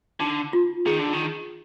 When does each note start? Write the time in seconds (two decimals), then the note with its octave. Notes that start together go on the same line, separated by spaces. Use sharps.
0.20 D3 D#4
0.53 F4
0.86 D#3 G#4
0.99 D3
1.13 D#3